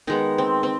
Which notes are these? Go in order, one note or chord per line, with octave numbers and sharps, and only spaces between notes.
D#3 G#3 B3 D#4
C4
C4